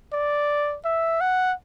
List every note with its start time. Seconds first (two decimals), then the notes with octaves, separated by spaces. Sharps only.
0.13 D5
0.85 E5
1.21 F#5